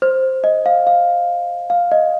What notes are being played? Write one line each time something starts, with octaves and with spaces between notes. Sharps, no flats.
C5
D#5
F5
F5
F5
D#5